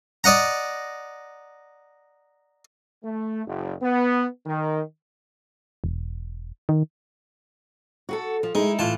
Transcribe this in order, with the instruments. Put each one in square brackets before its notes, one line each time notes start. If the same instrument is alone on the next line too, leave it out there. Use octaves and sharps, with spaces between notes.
[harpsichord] D5 D#5 F#5 A#5
[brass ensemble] A3
F#1
B3
D#3
[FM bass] E1
D#3
[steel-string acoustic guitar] F#4 G#4 A4
F3
[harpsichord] G#3 [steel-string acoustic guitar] D#4 E4
[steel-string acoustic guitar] A2 E3 [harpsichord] F4 A5